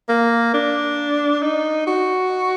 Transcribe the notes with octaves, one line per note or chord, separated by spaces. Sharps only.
A#3
D4
D#4
F#4